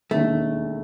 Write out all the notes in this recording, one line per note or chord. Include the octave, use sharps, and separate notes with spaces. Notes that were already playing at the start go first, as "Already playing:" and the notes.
E1 D#2 D#3 A3